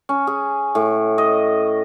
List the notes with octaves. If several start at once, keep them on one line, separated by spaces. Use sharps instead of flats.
C#4
G#4
A2
D#5